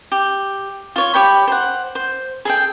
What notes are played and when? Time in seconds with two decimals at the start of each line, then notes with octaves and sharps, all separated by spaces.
0.12 G4
0.96 F4 C#5 C#6
1.14 G4 C#5 G5 B5
1.48 C5 F#5
1.95 C5
2.45 G#4 A4 G5